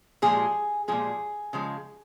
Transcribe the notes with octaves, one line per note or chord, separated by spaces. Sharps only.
A#2 F3 G#3 G#4
A#2 F3 G#3 G#4
C#3 F3 G#3